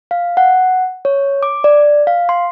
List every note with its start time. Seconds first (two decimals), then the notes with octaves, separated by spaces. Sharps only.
0.11 F5
0.37 F#5
1.05 C#5
1.43 D6
1.64 D5
2.07 F5
2.29 C6